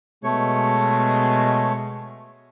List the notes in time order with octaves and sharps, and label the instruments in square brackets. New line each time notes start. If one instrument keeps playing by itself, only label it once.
[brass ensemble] B2 G#3 [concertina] A3 C#5